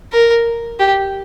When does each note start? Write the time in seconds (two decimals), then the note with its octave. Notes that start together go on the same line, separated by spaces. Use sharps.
0.12 A#4
0.79 G4